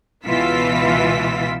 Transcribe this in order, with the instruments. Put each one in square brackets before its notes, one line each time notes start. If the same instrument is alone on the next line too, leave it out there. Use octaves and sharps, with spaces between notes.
[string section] C#2 B2 E3 F4 E6 B6